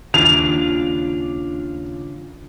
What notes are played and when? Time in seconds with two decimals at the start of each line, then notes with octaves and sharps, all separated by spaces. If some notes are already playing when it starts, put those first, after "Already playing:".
0.14 D#2 C#3 D4 F4 F7